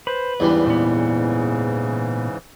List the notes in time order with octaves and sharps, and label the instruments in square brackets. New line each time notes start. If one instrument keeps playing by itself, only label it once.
[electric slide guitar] B4 [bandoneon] C5
[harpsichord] E2 G3 D4 [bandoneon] G#2 C#3 E3
[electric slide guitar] A#2 B3